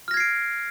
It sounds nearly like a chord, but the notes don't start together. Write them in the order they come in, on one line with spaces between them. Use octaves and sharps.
F6 A#6 G#6 C7 D7